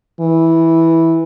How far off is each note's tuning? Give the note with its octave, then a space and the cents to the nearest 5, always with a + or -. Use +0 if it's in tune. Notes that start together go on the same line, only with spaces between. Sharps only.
E3 -10